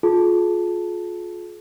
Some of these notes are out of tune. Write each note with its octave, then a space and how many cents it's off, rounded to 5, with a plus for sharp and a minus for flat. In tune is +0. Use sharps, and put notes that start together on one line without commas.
F4 +25 G#4 +40 A5 +0